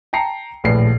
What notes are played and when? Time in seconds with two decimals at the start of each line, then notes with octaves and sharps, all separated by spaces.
0.13 G5 A5 A#5 C7 C#7
0.64 D#1 A#1 A2 B4 C7